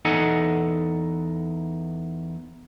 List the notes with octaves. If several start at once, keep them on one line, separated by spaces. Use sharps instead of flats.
E2 D#4 A4 D#5 F#5 G#5